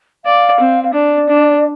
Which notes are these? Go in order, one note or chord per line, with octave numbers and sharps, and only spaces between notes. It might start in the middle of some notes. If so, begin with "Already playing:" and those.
D5 F5
C4
F5
D4 D5
D4